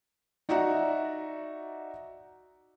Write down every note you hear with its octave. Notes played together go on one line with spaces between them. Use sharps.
D#4 F#4 D5 E5 F#5 A#5